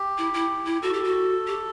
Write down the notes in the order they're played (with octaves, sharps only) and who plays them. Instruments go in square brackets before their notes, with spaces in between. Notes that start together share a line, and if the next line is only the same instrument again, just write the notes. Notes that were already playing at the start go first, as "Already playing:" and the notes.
Already playing: [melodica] G4
[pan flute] E4
E4
[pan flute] E4 [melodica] G4
[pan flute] F#4 [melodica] A4
[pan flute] G4
F#4
G4